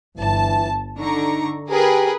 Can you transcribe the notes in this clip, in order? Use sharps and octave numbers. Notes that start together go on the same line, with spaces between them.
G1 E3 A5
D3 D#4 A#5 C#6
G4 G#4 A#4 B4